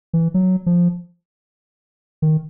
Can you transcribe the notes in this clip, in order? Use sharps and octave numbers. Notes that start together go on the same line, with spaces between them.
E3
F#3
F3
D#3